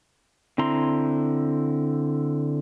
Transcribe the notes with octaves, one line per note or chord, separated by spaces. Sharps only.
D3 C4 E4 A#5 C6